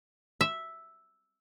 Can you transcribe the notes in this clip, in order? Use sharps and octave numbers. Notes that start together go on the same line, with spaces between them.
E5